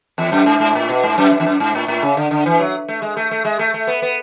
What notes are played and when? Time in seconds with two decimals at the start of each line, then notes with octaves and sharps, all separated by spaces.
0.18 E2
0.32 F#2
0.46 G#2
0.60 G#2
0.75 A2
0.89 B2
1.03 G#2
1.18 F#2
1.31 F#2
1.40 E2
1.47 F#2
1.60 G#2
1.75 A2
1.88 A2
2.02 C#3
2.17 D3
2.31 D3
2.46 E3
2.60 F#3
2.88 A3
3.02 G#3
3.17 A3
3.31 A3
3.45 G#3
3.59 A3
3.74 A3
3.87 B3
4.02 B3